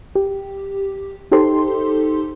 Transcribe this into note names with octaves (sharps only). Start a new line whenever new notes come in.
G4
D#4 G4 A4 C5 C6